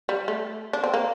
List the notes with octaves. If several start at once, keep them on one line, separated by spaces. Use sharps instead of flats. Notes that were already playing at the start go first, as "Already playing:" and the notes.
G3
A3
D4
C4
A#3